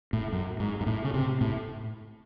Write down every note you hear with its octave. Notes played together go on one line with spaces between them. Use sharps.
A2
F#2
G#2
G#2
A2
C#3
C3
A2